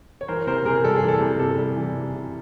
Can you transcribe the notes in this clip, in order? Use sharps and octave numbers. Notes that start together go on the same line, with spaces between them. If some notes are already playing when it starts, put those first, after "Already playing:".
C#5
E3 A#4 C5
C3 A#4 C5
C3 G#4 A#4
G3 A4
G#4
E3
A4
C3
C3 A4
G3
E3
C3
C3